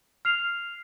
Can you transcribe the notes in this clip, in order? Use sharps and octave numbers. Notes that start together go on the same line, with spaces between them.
F6 C7 F7